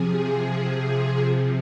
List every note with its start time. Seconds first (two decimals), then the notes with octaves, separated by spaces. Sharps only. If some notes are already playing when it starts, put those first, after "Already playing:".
Already playing: C3 F3 G#4
0.76 C3 F3